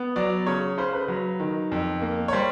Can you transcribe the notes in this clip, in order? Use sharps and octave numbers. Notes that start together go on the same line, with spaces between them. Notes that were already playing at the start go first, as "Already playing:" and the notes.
Already playing: B3
F#3 D5
C#3 C#5
C#3 C5
B4
F#3
D#3
F2
A#3
C#5
G3 C5